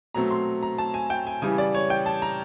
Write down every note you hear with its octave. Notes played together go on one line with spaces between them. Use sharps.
B2 F#3 A3 C4 A#5
C6
A#5
A5
G#5
G5
G#5
C#3 E3 G3 G#5
D5
C#5
G5
A5
A#5